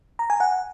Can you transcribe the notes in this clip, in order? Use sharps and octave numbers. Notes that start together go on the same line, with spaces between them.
A#5
G#5
F#5